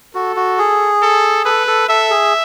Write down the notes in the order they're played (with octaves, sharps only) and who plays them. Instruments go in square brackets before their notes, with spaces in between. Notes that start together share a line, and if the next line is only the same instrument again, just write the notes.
[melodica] F#4 [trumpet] A4
[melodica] F#4
G#4
[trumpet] A4
[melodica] A4 [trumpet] B4
[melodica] A4
[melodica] A4 [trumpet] E5
[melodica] G#4